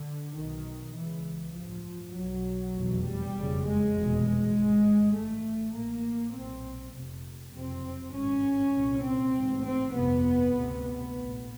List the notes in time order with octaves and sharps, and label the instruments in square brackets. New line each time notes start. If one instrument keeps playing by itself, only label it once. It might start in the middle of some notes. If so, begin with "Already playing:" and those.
Already playing: [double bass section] D3
B1 B2 D#3
C#2 C#3 E3
A1 G2 F3
B1 B2 F#3
F1 E2 B2
G3
F#1 F2 C#3
G#3
F1 E2 B2
G#3
G#1 G2
A1 G2 A3
A1 A2 A#3
B1 A#2 C4
F1 F2 C3
F#1 F2 C3 C4
G#1 G2 C#4
C2 A#2
C4
A1 G#2
C4
G1 F2 C3 B3
D2 C3
B3
A#1 A2